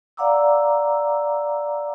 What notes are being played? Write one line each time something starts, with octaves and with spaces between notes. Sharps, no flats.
D5 F5 F#5 A#5 D6 E6